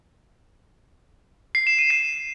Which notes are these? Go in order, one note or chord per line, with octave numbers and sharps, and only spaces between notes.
C7
E7
D#7
C7